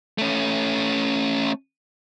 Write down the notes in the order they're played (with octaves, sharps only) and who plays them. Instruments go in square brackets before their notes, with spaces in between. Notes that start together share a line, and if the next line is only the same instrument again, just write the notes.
[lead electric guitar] A3 C#4